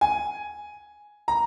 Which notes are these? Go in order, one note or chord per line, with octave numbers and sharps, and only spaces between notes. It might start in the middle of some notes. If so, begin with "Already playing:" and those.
G#5
A#5